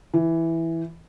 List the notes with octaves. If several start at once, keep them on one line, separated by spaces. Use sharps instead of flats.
E3